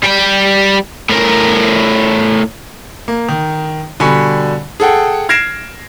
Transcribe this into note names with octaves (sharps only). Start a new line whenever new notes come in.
G3 G5
A2 A#4
A#3
D#3
B2 D3 G3 G#5 B5 C#6
G#4 A4 F#5 G5
F6 G#6 A#6 C7 D7 E7